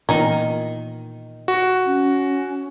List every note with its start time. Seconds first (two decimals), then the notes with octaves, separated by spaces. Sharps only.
0.09 A#2 D#3 E3 B3 D#4 A#4
1.48 F#4
1.87 C#4